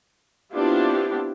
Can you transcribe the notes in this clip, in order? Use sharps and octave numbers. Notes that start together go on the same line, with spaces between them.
B3 C4 D4 E4 F4 G4